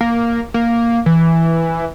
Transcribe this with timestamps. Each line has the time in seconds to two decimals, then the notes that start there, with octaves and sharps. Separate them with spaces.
0.01 A#3
0.54 A#3
1.06 E3